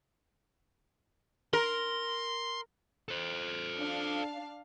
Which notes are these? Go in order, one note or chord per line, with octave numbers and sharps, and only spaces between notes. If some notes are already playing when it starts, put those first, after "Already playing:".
A#4 C6
A4 C5
D4 F5